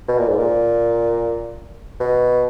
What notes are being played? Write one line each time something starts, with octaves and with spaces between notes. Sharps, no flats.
B2
A#2
G#2
A#2
B2